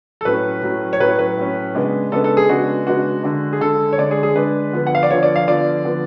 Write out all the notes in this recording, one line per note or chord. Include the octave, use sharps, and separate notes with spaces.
A4
A2 F#3 C#4 B4
A2 F#3 C#4
C#5
A2 F#3 C#4 B4
B4
A2 F#3 C#4
C#3 G#3 B3 D4
C#3 G#3 B3 D4 A4
A4
G#4
C#3 G#3 B3 D4 F#4
C#3 G#3 B3 D4 F#4
D3 G#3 D4
G#4
D3 G#3 D4 A4
C#5
D3 G#3 D4 D5
G#4
G#4
D3 G#3 D4 B4
D3 F3 B3
F#5
F5
D5
D3 F3 B3 C#5
D5
F5
D3 F3 B3 D5
D3 F3 B3